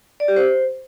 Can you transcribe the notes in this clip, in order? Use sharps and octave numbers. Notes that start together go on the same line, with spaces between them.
D5
G4
C5